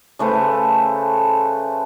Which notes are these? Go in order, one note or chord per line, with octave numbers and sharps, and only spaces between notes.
C#3 A3 B4 C5